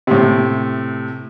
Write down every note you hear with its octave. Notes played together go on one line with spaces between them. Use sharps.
A2 C3